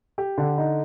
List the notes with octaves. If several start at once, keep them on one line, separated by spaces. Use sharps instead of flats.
G4
D3
D#4